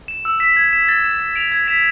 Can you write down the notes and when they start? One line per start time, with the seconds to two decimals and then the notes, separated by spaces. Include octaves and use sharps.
0.08 E7
0.25 E6
0.40 B6 E7
0.56 G#6
0.73 B6 E7
0.89 A6
1.04 E7
1.20 A6
1.36 D7 F7
1.52 G#6
1.67 B6 E7